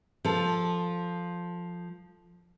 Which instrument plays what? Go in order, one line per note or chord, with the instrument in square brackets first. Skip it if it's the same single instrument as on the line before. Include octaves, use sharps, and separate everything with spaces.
[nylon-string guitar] F3 A4